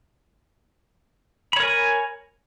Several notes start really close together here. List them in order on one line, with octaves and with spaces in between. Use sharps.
B5 C#5 A#4 G#5